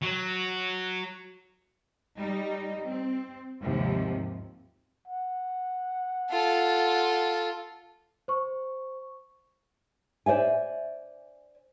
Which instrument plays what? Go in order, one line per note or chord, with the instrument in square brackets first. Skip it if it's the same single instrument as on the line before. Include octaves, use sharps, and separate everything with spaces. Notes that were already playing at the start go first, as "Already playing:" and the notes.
[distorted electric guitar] F#3
[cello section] G3 D#4
C4
D#2 G#2 C3 F3
[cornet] F#5
[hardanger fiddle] F4 A4
[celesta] C5 C#6
[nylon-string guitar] C5 D5 E5 G#5